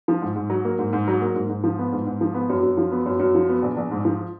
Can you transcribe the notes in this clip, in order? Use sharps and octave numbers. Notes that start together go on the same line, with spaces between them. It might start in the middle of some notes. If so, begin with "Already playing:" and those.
F3
G#2
G#2
F#3
A#3
G#2
G#2
F#3
A#3
G#2
G#2
F3
B3
G#2
G#2
F3
B3
F#2
F#2
F3
B3
F#2
F#2
F3
B3
A#1
A#1
G#2
F3